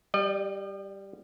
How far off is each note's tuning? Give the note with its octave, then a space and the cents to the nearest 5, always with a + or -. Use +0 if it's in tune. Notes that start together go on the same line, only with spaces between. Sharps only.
G3 +0 D#5 -45